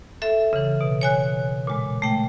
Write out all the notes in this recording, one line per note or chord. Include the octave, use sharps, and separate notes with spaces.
A4 E5
C#3 E3
B2
C#5 G#5 F#6
A#2 G#3
A3 G5